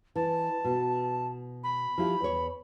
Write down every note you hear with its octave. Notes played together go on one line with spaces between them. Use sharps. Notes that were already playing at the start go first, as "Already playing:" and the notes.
E3 A5
B2
B5
F3 E4 G4
E2 C#5